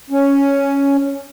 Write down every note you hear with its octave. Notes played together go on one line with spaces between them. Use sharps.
C#4